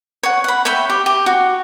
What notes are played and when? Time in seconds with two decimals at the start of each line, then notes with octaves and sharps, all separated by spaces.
0.23 C#5 F#5
0.44 F#5 B5
0.65 C#5 E5 G5 B5
0.89 G4
1.06 G4
1.26 F#4